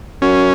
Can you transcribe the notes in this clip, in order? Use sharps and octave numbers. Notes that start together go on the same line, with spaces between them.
F#2 C#4